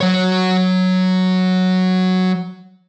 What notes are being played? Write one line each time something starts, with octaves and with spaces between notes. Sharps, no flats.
F#3 C#5